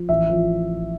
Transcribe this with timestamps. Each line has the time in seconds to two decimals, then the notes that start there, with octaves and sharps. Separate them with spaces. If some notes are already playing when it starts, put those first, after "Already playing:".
Already playing: F3
0.09 A1 E5
0.30 F3